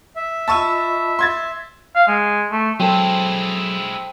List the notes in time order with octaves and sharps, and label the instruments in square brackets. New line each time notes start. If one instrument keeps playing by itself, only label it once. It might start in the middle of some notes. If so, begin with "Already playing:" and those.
[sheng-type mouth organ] E5
[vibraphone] F4 D#5 B5 [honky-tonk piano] A5 C#6 E6
[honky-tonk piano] C6 G#6 A6
[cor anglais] F5
G#3
A3
[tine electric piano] F#3 [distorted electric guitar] G#3 E4 [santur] C4 A4 C5